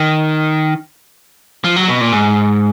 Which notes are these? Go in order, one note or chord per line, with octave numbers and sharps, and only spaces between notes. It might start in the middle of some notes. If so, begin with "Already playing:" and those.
Already playing: D#3
F3
F#3
B2
A#2
G#2